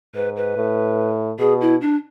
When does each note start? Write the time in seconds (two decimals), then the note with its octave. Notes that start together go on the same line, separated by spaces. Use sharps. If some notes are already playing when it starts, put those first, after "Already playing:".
0.15 G#2 B4
0.36 B4
0.57 A2
1.39 B2 G#4
1.61 E4
1.81 D4